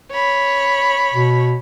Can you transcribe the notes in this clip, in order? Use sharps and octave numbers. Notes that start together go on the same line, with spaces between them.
C#5 B5
B2